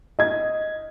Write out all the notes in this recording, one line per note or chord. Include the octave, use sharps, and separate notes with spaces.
D#5 G#6